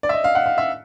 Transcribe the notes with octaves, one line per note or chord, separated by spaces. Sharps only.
D5
E5
D#5
F5
F#5
F5
E5